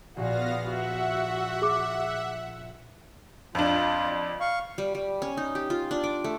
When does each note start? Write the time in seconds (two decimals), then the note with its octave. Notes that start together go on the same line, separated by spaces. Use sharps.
0.17 A#1 A#2 B3 F#4 F5 A#6
0.66 F#4 E5 F#5
1.62 G#4 D6
3.55 F2 D4 F4
4.40 F5 C#6
4.78 G3
4.95 G3
5.22 C#4
5.37 D#4
5.55 G4
5.70 F4
5.91 D4
6.04 D6
6.24 A3